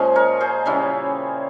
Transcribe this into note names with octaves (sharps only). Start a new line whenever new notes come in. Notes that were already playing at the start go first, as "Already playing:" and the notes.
Already playing: A#2 F3 G#3 C#4 G#4
A#4 C#5
G#4 C5
C#3 G3 C#4 E4